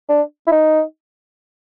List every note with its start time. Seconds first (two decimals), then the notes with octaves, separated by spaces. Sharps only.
0.09 D4
0.47 E4
0.52 D#4